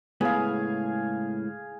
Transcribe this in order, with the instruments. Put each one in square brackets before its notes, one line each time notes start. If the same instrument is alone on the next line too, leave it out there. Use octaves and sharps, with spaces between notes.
[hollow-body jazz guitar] C#2 A2 B3 [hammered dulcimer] G#4 F5